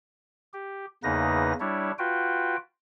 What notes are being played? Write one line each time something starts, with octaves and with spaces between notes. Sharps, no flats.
G4
E2 C#3 A#3 D#4 B4 A#6
G3 D4 E4 C#5
F4 F#4 B4 G5